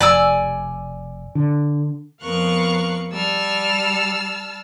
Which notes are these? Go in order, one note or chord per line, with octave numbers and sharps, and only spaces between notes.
F1 D5 G#5 E6
D3
F2 B3 A#4 F5 C#6 F#6
G3 A5 E6 F6